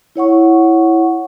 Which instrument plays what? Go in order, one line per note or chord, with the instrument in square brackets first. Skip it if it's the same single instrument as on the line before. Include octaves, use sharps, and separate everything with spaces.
[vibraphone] E4 C#5 F#5 C#6